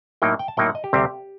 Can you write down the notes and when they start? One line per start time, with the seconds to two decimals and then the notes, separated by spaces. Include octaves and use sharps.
0.22 A2 F#3 A#3 D#4 G5
0.39 G5
0.48 A5
0.57 A2 F#3 A#3 D#4 G5
0.66 F#5
0.75 D#5
0.84 G4
0.93 D2 C3 G3 C4